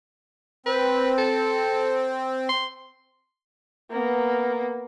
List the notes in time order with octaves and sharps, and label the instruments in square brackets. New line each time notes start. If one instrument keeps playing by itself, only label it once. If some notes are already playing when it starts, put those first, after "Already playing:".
[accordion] C4 [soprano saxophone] B4
[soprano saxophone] A4
C6
[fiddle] A#3 B3